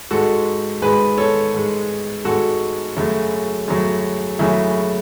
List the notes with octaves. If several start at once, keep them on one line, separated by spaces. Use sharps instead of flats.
G#2 G#3 F#4 A4
G#2 G#3 G#4 B4
A4 C#5
G#2 G#3
G#2 G#3 F#4 A4
F#2 C#3 F#3 A3
F#2 C#3 F#3 A3
F#2 C#3 F#3 A3 E4 G#4